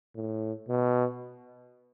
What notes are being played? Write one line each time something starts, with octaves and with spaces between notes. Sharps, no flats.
A2
B2